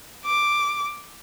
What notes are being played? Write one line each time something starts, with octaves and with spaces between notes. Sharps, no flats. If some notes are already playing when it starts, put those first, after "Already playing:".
D6